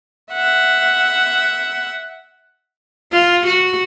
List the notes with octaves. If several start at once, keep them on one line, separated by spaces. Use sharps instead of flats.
E5 F#5
F4
F#4